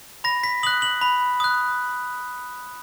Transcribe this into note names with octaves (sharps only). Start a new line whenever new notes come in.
B5 A#6
B6
D#6 F#6 F#7
F#7
B5
D#6 F#6